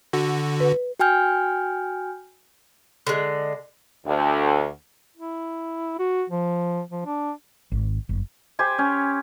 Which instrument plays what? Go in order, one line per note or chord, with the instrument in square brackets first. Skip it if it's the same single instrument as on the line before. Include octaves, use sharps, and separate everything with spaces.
[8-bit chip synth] D3 F#4
[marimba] B4
[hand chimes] F#4 G5 G#5 F6 G6
[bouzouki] D3 G#3
[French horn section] D2
[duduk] E4
F#4
F3
F3
D4
[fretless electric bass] G#1
F#1
[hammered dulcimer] G4 C5 G#5
C#4